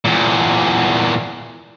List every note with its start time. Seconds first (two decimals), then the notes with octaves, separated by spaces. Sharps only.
0.05 E2 A#2